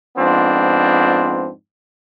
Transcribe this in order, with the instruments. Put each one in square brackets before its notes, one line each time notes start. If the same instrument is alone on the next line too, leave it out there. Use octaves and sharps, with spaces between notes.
[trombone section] F2 G#2 F3 B3 C4 D4